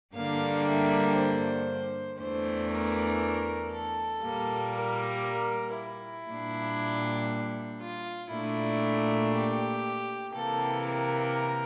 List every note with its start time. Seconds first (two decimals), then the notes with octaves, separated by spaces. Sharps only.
0.14 G2 D3 G3 A#3 D4 F5
0.66 E5
1.17 C5
2.19 E2 E3 A3 D4 C5
2.69 A#4
3.72 A4
4.23 A#2 G3 A#3
4.74 A#4
5.25 A#4
5.76 E4
6.28 A#2 G3 D4
7.81 F4
8.31 A#2 A3 D4 E4
9.34 G4
10.35 C3 E3 A#3 A4
10.87 A#4